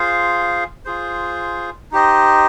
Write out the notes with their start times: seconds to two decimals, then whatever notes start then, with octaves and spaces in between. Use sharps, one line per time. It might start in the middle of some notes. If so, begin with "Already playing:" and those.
Already playing: F4 G#4 C5 F5
0.85 F4 G#4 C5
1.91 D#4 G4 C5 D#5